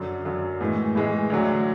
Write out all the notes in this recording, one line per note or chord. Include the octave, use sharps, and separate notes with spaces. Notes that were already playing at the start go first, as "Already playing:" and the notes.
Already playing: F#2 D3 F#3
F#2 D3 F#3
A2 E3 G#3
A2 E3 G#3
D2 D3 F#3